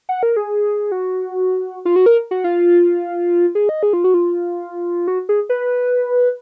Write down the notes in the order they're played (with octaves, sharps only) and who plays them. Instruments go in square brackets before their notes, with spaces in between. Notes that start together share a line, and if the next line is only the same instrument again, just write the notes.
[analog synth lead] F#5
A#4
G#4
F#4
F4
F#4
A#4
F#4
F4
G#4
D#5
G#4
F4
F#4
F4
F#4
G#4
B4